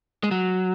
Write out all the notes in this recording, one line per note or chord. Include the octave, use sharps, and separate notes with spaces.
G#3
F#3